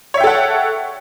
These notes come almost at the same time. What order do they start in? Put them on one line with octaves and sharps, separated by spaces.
C#5 E5 G5 A4 F#5